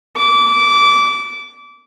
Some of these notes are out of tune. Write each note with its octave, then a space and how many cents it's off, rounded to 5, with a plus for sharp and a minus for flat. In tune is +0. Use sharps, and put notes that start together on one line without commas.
D6 -20